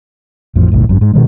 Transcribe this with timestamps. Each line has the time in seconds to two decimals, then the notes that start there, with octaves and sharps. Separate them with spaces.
0.56 A1 F2 A2 F3
0.72 F#1 B1 A2
0.89 G#1 F#2
1.01 G#2
1.13 B2 D#3 G#3